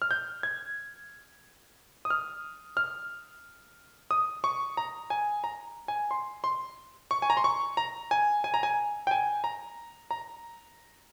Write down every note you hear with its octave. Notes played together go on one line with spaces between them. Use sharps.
F6
G6
G#6
D#6
F6
F6
D#6
C#6
A#5
G#5
A#5
G#5
C6
C6
C#6
G#5
A#5
C6
C#6
A#5
G#5
G#5
A#5
G#5
G5
G#5
A#5
A#5